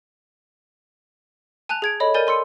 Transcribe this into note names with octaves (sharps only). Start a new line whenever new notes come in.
G#5 A5 F#6 F7
G#4 G#6 D7
A4 C#5 D#5 B5
A#4 D5 G#5 G6 A6 D#7
G#5 C6 E6 C#7